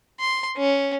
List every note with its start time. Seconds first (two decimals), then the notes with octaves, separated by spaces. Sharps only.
0.20 C6
0.58 C#4